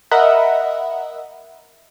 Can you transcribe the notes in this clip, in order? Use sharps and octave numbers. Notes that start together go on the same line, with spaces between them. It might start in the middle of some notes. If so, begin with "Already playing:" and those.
A#4 D#5 E5 F#5 B5